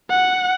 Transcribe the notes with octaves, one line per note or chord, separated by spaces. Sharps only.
F#5